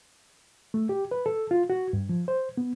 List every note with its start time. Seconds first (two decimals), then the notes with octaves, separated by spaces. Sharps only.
0.74 A3
0.89 G4
1.11 B4
1.26 A4
1.51 F4
1.70 F#4
1.93 G2
2.09 F3
2.28 C5
2.58 B3